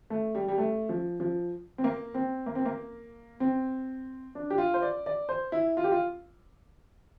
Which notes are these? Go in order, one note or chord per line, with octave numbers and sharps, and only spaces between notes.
A3
G3
G3
A3
F3
F3
C4
A#3
C4
A#3
C4
A#3
C4
D4
G4
F4
C5
D5
D5
C5
E4
F4
G4
F4